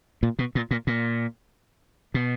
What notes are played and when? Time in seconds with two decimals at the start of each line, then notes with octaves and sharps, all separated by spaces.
0.23 A#2
0.39 B2
0.55 A#2
0.71 A#2
0.87 A#2
2.14 B2